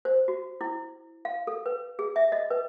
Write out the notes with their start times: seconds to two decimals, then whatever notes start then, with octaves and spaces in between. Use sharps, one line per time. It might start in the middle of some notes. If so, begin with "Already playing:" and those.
0.05 C5
0.28 F#4
0.61 E4
1.25 F5
1.47 A4
1.66 B4
1.99 G#4
2.16 E5
2.32 D#5
2.50 B4